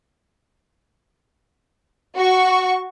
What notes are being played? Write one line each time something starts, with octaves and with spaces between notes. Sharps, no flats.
F#4 C#6